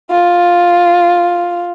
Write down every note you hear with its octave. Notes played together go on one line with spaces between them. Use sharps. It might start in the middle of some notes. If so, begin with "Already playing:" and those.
F4